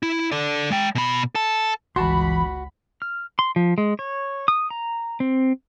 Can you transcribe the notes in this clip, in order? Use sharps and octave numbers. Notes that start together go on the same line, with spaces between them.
E4
A4 D5
G#3 G5
B2 B5
A4 A5
G1 C#2 E3 F#4 A5 B5 C6
F6
C6
F3
G#3
C#5
D#6
A#5
C4